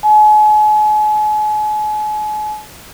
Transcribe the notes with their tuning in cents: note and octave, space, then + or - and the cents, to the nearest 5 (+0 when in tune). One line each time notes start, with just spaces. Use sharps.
G#5 +40